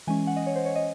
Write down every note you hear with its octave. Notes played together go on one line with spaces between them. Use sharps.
E3 G#3 C#4 G#5
F#5
D#5
C#5
C5
C#5
D#5